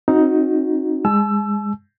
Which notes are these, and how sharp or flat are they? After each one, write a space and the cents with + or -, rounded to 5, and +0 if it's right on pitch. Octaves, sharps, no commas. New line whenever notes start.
C4 +45 D#4 +10 F#4 -10
G#3 -25 A5 -40 E6 +20